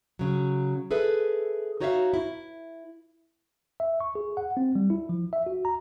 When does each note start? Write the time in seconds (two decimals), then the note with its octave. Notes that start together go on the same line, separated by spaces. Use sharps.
0.19 C#3 F#3
0.91 G#4 A4 B4 E5
1.80 D#4 F#4 C#5 D5 E5 F5
2.14 E4
3.80 E5
4.00 C#6
4.15 G#4
4.37 F#5
4.57 C4
4.75 G3
4.90 E4
5.09 F3
5.33 E5
5.46 F#4
5.65 A#5